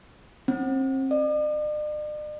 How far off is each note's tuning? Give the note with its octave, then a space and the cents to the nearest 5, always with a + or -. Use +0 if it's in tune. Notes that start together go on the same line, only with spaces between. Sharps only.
C4 +35
D5 +45